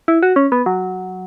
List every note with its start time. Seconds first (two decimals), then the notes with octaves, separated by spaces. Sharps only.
0.08 E4
0.23 F#4
0.36 C#4
0.52 B3
0.66 F#3